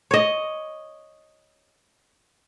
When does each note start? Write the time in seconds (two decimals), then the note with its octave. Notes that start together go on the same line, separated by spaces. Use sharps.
0.11 C#5 D#5